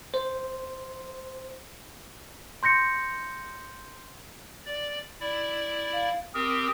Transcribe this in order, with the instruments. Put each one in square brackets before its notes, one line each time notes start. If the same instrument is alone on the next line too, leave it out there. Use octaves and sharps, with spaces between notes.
[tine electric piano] C5
[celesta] C6 G6 A#6 C#7
[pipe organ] D5
E4 D5
[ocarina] F5
[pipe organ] C4 G4 A#4 [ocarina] D#6